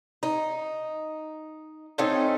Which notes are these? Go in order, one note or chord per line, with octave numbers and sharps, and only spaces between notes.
D#4
A3 C4 C#4 D#4